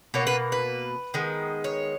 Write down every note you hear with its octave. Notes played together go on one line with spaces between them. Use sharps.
B2 A#3 C#5
B4
B4
D#3 G#3 B3
C#5